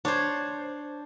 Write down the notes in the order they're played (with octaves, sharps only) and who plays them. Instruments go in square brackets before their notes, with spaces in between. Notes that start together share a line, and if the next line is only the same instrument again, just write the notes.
[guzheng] D4 C5 [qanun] C#5